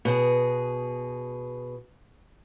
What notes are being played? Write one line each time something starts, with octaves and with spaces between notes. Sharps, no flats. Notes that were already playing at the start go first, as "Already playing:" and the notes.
B2 G#4